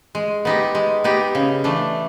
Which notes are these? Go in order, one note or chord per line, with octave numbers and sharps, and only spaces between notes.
G#3
B3 D#4 G4
G#3
B3 D#4 G4
C#3
E3 A3 D4